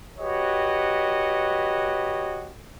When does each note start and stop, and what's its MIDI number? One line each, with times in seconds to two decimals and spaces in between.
0.19 2.52 66
0.19 2.52 67
0.19 2.52 71
0.19 2.52 73
0.19 2.52 75